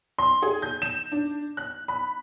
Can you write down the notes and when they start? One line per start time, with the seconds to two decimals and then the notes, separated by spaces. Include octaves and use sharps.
0.18 C6
0.42 G#4
0.62 G6
0.82 E7
1.12 D4
1.57 F#6
1.88 B5